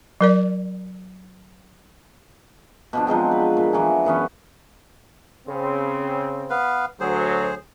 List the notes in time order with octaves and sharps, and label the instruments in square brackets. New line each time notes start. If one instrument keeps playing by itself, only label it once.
[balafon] F#3 A#4 D5
[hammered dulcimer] B2 F3 D4
F3 F#3 G#3 C4
B4
A#2
E3 F#3 G#4 G#5
F#2 E3 B3 C#4
[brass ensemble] C#3 C4
[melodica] B3 B4 F5
[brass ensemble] D2 F#3 [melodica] G#4 C5